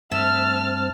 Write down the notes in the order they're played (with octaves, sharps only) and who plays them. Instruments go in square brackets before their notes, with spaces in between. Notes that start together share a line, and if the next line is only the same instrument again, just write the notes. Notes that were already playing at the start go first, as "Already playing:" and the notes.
[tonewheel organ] G2 C4 [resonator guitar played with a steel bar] A3 E5 [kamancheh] A5 F6